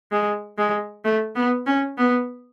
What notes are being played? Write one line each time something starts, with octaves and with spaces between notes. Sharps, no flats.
G#3
G#3
A3
B3
C#4
B3